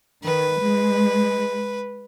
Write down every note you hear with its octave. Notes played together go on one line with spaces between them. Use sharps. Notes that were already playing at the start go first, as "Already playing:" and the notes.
D#3 B4
G#3